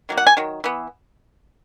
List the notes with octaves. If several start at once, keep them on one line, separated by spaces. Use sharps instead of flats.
D#3 F#3 A#3
F#5
G#5
D#3 F#3
E3 B3